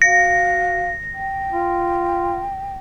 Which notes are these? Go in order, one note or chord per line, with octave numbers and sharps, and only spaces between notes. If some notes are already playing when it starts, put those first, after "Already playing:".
F#4 F5 A#6
G5
F4